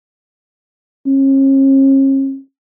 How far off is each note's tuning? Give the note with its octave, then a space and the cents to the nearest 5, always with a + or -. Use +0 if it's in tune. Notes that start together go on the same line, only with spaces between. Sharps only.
C#4 -40